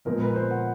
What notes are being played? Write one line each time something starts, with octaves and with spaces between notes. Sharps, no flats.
A#2 F3 G#3 B3 A#4
B4
C5
F#5